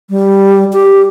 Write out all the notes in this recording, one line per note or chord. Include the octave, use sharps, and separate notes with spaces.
G3
G4